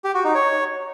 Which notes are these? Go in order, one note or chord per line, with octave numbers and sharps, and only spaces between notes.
G4
F#4
D#4
C#5